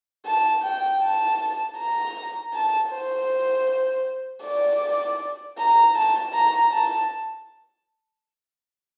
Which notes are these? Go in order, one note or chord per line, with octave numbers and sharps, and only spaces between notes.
A5
G5
A5
A#5
A5
C5
D5
A#5
A5
A#5
A5